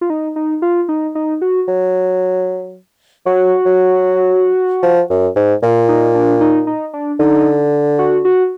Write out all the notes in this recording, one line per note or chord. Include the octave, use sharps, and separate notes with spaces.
F4
D#4
D#4
F4
D#4
D#4
F#4
F#3
F#3 F#4
F#3
F3
F#2
G#2
A#2 F4
D#4
D4
D#4
D#4
D4
D3 D#4
F#4
F#4